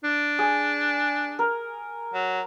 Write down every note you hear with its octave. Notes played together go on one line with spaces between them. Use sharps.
D4
G#4
A#4
F#3